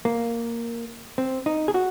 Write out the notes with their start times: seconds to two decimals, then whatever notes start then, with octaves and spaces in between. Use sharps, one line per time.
0.05 A#3
1.18 C4
1.46 D#4
1.68 G#4
1.74 F#4